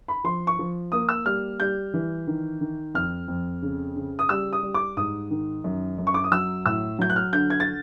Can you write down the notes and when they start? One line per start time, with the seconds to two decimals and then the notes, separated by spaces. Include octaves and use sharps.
0.08 B5
0.24 F3 C6
0.47 C#6
0.59 F3
0.92 A#3 D#6
1.09 E6
1.26 G3 F6
1.60 G3 G6
1.94 E3
2.27 D#3
2.61 D#3
2.94 F2 F6
3.28 F2
3.62 C#3
3.96 C#3
4.19 D#6
4.29 G3 E6
4.53 D#6
4.63 G3
4.74 D6
4.97 G#2 D#6
5.31 D#3
5.64 F#2
5.98 F#2
6.07 C#6
6.14 D6
6.24 D#6
6.32 F#3 E6
6.66 A2 E6
6.99 F#3 G6
7.10 F#6
7.16 F6
7.33 D3 G6
7.50 G#6
7.60 A6